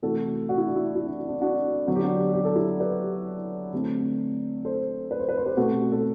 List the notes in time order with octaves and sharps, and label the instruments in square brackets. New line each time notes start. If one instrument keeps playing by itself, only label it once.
[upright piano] C3 E3 A3 F#4 A4
F#4
E4
D4
E4
E4
D4
D4
D4 F#4
D3 F#3 B3 F#4
G4
D4 F#4
G4
A4
E4 G4
G4 B4
D3 A3 C4
A4 C5
B4
C5
B4
C5
G4 B4
B2 A3 C4 F#4 A4
A4